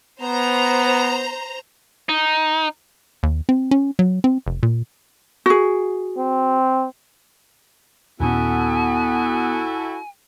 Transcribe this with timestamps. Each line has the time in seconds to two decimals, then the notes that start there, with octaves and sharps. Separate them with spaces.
0.21 B3 C5 A#5
2.09 D#4
3.23 D#2
3.49 C4
3.71 C#4
3.99 F#3
4.24 C4
4.47 F1
4.63 A#2
5.46 F#4 G#4
6.17 C4
8.20 D#2 A#2 B3 C#4 E4 F#4 A4 G#5